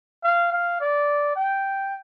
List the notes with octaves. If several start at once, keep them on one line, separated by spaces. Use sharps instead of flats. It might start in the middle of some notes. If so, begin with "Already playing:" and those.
F5
F5
D5
G5